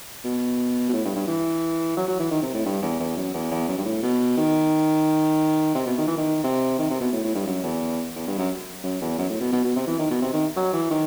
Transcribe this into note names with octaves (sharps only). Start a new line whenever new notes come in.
B2
B2
A2
G2
G2
E3
F#3
F#3
E3
D#3
C3
A2
G2
E2
E2
F#2
E2
E2
F#2
G2
A2
B2
D#3
C3
B2
D#3
E3
D#3
C3
D#3
C3
B2
A2
A2
G2
F#2
E2
E2
G2
F#2
F#2
E2
F#2
A2
B2
B2
B2
C3
E3
D#3
B2
C3
D#3
F#3
E3
D#3